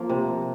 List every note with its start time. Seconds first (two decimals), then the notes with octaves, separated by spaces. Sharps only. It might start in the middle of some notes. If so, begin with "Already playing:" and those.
Already playing: F3 A#3
0.09 C3